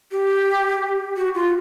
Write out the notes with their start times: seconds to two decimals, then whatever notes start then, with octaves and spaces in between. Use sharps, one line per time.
0.12 G4
1.17 F#4
1.35 F4